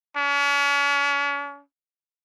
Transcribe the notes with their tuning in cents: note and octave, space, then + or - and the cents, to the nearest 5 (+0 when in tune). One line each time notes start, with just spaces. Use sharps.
C#4 +40